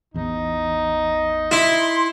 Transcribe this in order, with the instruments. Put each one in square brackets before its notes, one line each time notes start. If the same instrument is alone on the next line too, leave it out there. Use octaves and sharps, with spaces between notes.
[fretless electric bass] A1 E2 [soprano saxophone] D#4
[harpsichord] E4 [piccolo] C6